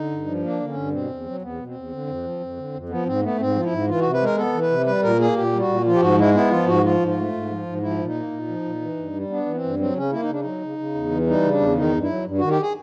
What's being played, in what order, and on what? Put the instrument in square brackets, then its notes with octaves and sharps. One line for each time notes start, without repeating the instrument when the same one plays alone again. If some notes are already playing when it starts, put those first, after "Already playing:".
Already playing: [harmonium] D3 D#4
G2
F3
A#3 D4
D3
C#4
G2
B2 C4
E2
F#3
E2 B3
B2
C4
E2
D3
F2
F3
F2
D3
F2
F3 B3
G#2 C4
A3 B3
G#2 C4
F3 F4
E4
G#2
E3 F4
C3 F#4
B4
G#3 A#4
B3 A4
E3
B4
C3
G3 B4
A#2 A#4
A#3 G#4
A#2 G4
G3
F#4
A#2
F3 F4
G4
G#2 F#4
G#3 E4
B3 E4
F3 F4
G#2 F#4
F3 F4
G#2
F4
A3
G#2
F3
G#2
F3 E4
A#2
D#4
A#3
A#2
F3
A#2
E3
G2
G3
B3 D4
E3
C4
G2
F#3 C4
C#3 C#4
A#3 E4
D#4
C#3 D4
F#3 D#4
C#3
C#3
E2
E3
G3 D#4
C#3
D4
E2
D#3 D#4
G2
E4
F#3
G2
D#3 F#4
G4
G#4